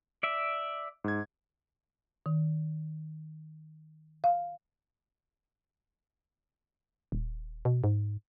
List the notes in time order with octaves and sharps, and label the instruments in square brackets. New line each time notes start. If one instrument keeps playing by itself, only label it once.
[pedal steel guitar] D5 E5
[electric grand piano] G#2 G#6
[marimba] D#3
F5
[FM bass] D#1
B2
G#2